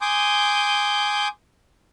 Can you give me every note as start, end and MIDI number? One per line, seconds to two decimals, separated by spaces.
0.01 1.28 80
0.01 1.28 84
0.01 1.28 86
0.01 1.28 87
0.01 1.28 91